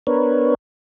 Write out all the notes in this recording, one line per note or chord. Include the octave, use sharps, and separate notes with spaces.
B3 D4 A#4 B4 C#5